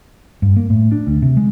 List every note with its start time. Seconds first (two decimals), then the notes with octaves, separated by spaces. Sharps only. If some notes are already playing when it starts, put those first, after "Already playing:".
0.42 G2
0.56 A#3
0.70 A2
0.92 D4
1.07 D2
1.22 C3
1.37 G#3